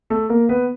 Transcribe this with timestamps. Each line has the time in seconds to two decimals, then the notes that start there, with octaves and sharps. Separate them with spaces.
0.10 A3 A4
0.29 A#3 A#4
0.49 B3 B4